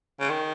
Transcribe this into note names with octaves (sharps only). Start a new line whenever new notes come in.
C#3
D#3